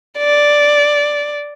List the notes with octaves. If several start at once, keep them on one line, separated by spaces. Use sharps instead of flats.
D5